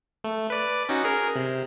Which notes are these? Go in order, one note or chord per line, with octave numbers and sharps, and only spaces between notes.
A3
B4 D5
C#4 D#4 F#4
G#4 A#4
C3